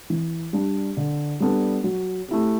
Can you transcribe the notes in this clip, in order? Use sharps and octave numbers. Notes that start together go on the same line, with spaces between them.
E3
G3 D4
D3
G3 B3 D4 A4
F#3
A3 E4 G4